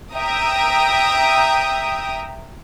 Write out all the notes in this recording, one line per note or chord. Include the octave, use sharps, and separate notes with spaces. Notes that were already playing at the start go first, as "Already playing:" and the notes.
E5 G5 A#5 D#6